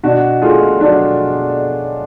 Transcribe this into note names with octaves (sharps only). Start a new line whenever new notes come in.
B2 D4 F#4
A3 F4 G#4
F#3 D4 F#4